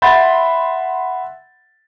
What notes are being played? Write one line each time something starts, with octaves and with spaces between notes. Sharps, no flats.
E5 F#5 B5 C6 G6 A6